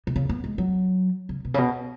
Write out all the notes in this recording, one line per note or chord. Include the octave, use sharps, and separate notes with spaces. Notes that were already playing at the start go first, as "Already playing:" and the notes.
B2
C#3
B3
G#3
F#3
C#3
B2
C#3
B2